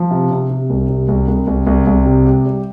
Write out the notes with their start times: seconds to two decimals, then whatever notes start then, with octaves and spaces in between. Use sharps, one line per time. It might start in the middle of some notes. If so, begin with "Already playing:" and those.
Already playing: F3
0.11 C3
0.31 C3
0.49 C3
0.70 C2
0.89 C3
1.08 C2
1.28 C2
1.47 C2
1.67 C2
1.87 C2
2.05 C3
2.25 G4
2.45 G3